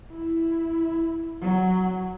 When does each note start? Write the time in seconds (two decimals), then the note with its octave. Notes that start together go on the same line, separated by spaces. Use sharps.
0.12 E4
1.41 F#3